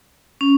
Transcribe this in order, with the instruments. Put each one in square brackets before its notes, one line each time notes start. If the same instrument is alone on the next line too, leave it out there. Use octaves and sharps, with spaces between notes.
[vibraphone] C#4